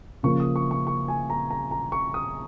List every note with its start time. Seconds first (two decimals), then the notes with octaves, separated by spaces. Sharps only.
0.23 C#3 F3 A#3 C#6
0.40 D#6
0.56 C#6
0.71 C#6
0.87 C#6
1.08 G#5
1.30 A#5
1.50 A#5
1.71 A#5
1.92 C#6
2.14 D#6